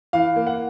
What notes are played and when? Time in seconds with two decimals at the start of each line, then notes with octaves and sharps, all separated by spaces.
0.13 E3 F5
0.36 A#3
0.47 F#5